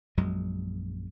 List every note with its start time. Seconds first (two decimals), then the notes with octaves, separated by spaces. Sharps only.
0.17 A#1 F#2 F#3 G#3